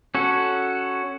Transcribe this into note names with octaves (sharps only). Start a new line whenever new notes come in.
C#4 F#4 A4